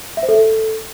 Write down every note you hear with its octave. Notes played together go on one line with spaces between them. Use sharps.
E5
C5
A4